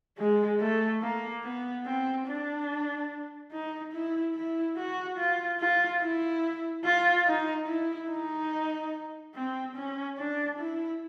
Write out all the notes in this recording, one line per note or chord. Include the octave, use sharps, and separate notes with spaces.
G#3
A3
A#3
B3
C4
D4
D#4
E4
E4
F#4
F4
F4
E4
F4
D#4
E4
D#4
C4
C#4
D4
E4